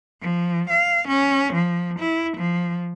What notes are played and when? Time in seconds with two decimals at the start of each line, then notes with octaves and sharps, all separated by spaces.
0.21 F3
0.70 F5
1.08 C#4
1.53 F3
1.99 E4
2.37 F3